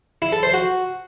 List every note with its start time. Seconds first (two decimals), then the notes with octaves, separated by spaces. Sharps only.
0.22 E4
0.32 A4
0.43 C5
0.54 F#4